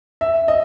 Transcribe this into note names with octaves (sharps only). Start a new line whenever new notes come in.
E5
D#5